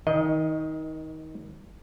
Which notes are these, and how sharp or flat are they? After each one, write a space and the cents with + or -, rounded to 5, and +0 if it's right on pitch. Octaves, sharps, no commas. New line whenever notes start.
D#3 +25 D#5 +0